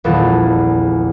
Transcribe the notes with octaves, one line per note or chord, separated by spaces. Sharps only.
D#1 A#1 E2 F3 A4